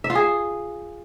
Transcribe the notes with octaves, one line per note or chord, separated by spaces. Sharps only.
E5
F4
G#4